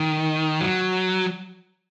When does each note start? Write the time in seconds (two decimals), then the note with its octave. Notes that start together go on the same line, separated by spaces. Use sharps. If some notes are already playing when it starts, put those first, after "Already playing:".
Already playing: D#3
0.61 F#3